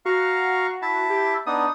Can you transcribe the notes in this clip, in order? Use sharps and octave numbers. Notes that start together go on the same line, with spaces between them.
F#4 F5 A#5 C#6
E4 E5 A5
G4
B3 D4 D#4 D#6